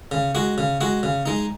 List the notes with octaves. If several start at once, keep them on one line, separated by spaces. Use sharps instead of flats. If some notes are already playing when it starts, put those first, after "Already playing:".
C#3
G#3 F#4
C#3
G#3 F#4
C#3
G#3 D#4